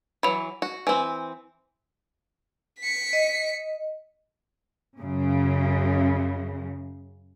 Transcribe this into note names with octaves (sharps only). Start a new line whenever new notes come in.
E3 F#3 B5 F7
F#4
E3 C4 G#5
B6 C#7
D#5
F#2 C#3